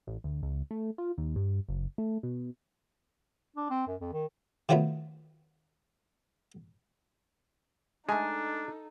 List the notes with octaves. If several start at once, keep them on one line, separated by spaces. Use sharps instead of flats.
A1
D2
C#2
A3
F4
D#2
G2
F#1
A3
B2
D4
C4
F#2
F2
D#3
D#3 F3 F#3 A3 B3
G#3 A3 D4 D#4 A4 G#5 A#5